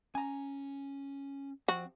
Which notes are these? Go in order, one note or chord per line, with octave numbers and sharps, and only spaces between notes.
C#4 G#5 A#5
F2 C4 F#4